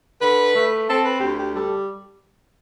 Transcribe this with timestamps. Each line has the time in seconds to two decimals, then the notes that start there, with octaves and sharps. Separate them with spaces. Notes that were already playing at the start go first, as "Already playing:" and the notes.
0.22 D3 B4
0.55 A3
0.88 C4 A4
1.04 B4
1.21 D2 G4
1.38 G4
1.53 G3 A4